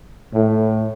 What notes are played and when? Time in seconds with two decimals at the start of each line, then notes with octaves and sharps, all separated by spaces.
0.33 A2